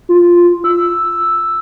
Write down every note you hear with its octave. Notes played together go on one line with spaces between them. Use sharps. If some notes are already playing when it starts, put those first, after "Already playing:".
F4
E6